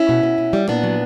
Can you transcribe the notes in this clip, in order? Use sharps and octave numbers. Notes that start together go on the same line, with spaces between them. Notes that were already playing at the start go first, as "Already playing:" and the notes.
Already playing: C#4 E4
B2
B2
B2
G3
A#2 B3 D4
F#3